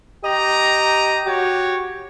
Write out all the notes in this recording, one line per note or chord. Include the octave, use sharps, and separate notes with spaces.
G4 D#5 A#5
F#4 G4 C#5